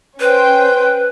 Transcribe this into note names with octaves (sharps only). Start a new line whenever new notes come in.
C#4 B4 C5 G5